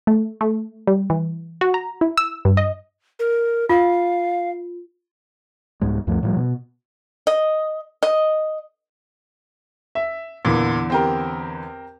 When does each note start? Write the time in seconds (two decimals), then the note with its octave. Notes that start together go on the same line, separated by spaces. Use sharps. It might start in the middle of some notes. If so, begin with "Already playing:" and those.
0.07 A3
0.41 A3
0.87 G3
1.10 E3
1.61 F#4
1.74 A#5
2.01 E4
2.18 E6
2.45 G2
2.57 D#5
3.19 A#4
3.70 F4 F5
5.81 C2 G#2 G#3
6.07 D2 G2 F3 A3
6.23 A2 F3 G3
6.37 B2
7.27 D#5
8.03 D#5
9.95 E5
10.45 E2 A#2 D3 E3
10.90 C4 G4 A#4